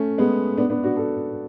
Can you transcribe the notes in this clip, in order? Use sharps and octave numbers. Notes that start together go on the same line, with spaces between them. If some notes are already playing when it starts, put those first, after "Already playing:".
Already playing: A3 C#4
G#3 B3
B3 D4
B3 D4
D4 F#4
F#4 A4